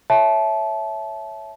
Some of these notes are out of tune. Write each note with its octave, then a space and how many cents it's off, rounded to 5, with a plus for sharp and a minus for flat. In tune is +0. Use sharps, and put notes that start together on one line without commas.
C#5 +0 E5 +0 A5 -25